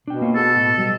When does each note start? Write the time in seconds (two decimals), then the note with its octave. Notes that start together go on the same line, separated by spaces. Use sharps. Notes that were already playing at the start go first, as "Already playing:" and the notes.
0.07 B2 D4 G5
0.21 A#3 F4 C#5
0.35 F#4 G#4 A4
0.56 A2
0.78 F#3 G3 D#5